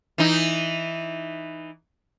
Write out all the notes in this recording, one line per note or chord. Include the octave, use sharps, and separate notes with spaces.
E3 D#4